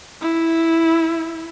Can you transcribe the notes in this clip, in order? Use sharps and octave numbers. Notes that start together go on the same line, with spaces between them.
E4